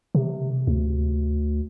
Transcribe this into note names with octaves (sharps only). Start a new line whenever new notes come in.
C3
D2